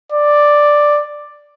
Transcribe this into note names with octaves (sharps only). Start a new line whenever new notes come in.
D5